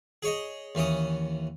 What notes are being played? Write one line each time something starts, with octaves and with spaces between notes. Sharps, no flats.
G#4 C#5 D#5
D#2 E3 C#4 D#6